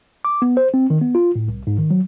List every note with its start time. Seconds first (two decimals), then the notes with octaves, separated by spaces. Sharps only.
0.25 D6
0.42 B3
0.57 C5
0.74 C4
0.90 D#3
1.02 B3
1.15 F4
1.35 A2
1.48 C2
1.67 G#2
1.79 D#3
1.91 F#3